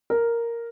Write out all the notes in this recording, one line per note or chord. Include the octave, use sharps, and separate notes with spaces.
A#4